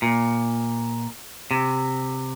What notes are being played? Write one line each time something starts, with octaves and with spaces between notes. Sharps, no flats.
A#2
C3